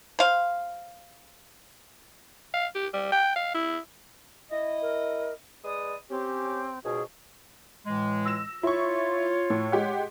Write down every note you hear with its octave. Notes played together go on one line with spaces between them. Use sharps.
C5 F5
F5
G4
G3
G5
F5
E4
E4 D#5
A#4
G#3 B4 D5 D#6
C4 C#4 G4
C#2 G#2 B2 G#4
A2 E3 G#3
E6 A#6 E7
E4 F4 C#5 C#6
A2
G#3 G4 F#5